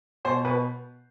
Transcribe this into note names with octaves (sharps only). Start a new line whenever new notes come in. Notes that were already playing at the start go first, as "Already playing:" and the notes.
B2 C5
B2 B4